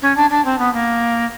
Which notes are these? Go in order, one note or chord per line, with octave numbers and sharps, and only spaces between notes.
C#4
D4
D4
C4
B3
A#3